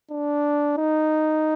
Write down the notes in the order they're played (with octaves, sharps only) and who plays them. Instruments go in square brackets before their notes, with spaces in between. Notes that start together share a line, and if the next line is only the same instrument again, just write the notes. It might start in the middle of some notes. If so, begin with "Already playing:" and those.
[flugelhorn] D4
D#4